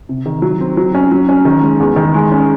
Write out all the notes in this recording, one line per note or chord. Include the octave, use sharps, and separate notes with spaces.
C3
D#3
F#3
C4
F#3
C#4
F#3
C#4
D#3
G#3
E2
D#3
G#3
C#4